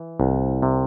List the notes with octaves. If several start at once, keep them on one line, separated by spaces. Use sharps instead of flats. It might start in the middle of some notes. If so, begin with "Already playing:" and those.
Already playing: E3
C2
C3